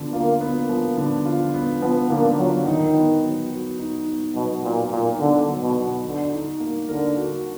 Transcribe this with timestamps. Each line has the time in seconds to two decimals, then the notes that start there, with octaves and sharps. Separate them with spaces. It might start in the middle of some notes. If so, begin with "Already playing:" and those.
Already playing: D3 F3 B3
0.13 A#3 F4
0.41 B3
0.55 A#3
0.69 F3
0.97 D3
1.25 F4
1.54 B3
1.81 F3 B3
2.10 D3 A#3
2.38 F#3 F4
2.66 D#3 D#4
2.94 B3
3.23 F#3
3.50 F#4
3.79 D#4
4.07 B3
4.35 B2 F#3
4.63 A#2 F#4
4.91 A#2 D#4
5.19 D3 B3
5.47 F#3
5.62 B2
5.76 F#4
6.03 D3 F#4
6.32 D#4
6.60 A#3
6.89 D3 A#4
7.16 F#4